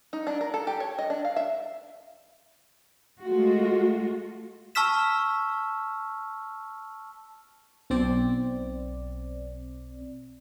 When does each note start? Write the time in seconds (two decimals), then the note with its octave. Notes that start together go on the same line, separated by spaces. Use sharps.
0.13 D#4
0.27 D4
0.41 A#4
0.54 A4
0.67 G4
0.80 C#5
0.99 D#5
1.10 D4
1.25 F5
1.36 E5
3.23 G#3 A3 F4 F#4
4.75 A5 C#6 E6 F6 B6 E7
7.90 B1 C4 D5